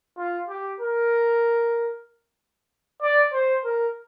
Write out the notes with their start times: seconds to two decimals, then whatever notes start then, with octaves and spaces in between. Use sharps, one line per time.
0.17 F4
0.48 G4
0.80 A#4
3.02 D5
3.33 C5
3.65 A#4